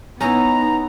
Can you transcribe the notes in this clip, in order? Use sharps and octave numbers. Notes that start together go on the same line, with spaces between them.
B3 C#4 D#4 E4 A#5